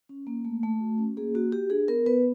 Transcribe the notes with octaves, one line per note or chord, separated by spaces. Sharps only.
C#4
A#3
A3
A3
F#4
C#4
A#3 G#4
A#3 F#4
F#4 G4
D4 G#4
B3 A#4
B3 B4